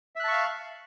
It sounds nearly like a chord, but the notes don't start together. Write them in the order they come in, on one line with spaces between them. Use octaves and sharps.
E5 F#6 A5 C#6 F5